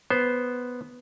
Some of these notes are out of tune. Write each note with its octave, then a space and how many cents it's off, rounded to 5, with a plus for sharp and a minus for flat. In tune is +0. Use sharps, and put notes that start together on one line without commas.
B3 +0 C5 +0